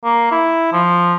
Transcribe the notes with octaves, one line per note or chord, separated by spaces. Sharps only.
A#3
E4
F3